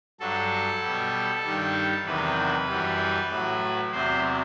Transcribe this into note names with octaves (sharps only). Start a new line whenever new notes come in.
G2 F#3 A4
B2 G3
G2 D#3 G3
E2 C3 D#3 F#3 B4
F#2 E3 G3
A2 F#3
E2 C3 F#3 C5